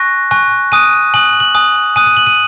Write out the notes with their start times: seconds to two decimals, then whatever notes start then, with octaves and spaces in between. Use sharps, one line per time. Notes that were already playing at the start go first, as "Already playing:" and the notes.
Already playing: G#5 C#6 F#6 A#6
0.31 G#5 C#6 F#6
0.72 G#5 D#6 F#6 D#7
1.14 G#5 D#6 F#6 F#7
1.40 F#7
1.54 G#5 D#6 F#6
1.96 G#5 D#6 F#6 D#7
2.06 D#7
2.17 F#7
2.27 D#7